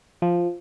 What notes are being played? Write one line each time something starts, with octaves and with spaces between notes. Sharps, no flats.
F3